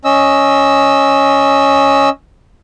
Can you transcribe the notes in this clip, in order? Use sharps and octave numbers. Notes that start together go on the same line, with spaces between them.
C#4 D#5 E6